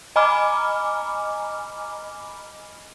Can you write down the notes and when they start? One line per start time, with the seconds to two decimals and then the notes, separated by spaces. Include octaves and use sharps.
0.16 D#5 G#5 A#5 B5 D6 F6